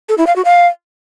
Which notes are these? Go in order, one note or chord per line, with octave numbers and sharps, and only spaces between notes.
A4
E4
F5
F#4
F5